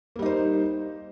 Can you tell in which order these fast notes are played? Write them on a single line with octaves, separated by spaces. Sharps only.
A#3 G3 D#4 C5